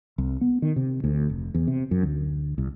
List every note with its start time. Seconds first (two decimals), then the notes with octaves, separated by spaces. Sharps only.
0.18 C2
0.41 B3
0.62 D#3
0.76 C3
1.04 D2
1.29 F1
1.54 E2
1.67 C3
1.91 F#2
2.03 D2
2.58 C2